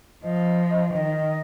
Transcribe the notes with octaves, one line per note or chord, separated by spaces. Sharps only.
F3 D#5
D#3 D#5